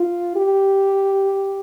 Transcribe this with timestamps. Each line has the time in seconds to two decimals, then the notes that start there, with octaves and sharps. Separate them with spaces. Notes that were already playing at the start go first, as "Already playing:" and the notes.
Already playing: F4
0.36 G4